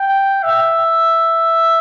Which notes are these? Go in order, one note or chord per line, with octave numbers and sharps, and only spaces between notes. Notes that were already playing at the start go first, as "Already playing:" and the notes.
Already playing: G5
E5